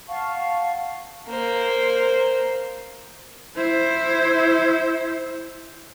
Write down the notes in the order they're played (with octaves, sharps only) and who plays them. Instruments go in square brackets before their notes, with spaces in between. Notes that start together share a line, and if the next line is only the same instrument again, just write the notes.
[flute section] F5 F#5 A5 C#6
[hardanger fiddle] A#3 C5
[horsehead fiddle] E4 C5